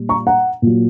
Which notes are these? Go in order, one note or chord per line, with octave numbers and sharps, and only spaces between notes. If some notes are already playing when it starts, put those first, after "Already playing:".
Already playing: A#2 G3
A#5 C#6
F#5 A#5
A#2 F#3